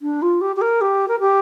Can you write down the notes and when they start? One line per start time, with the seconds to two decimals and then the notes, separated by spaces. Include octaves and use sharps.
0.02 D4
0.22 F4
0.41 G4
0.56 G4
0.61 A#4
0.81 G4
1.08 A#4
1.20 G4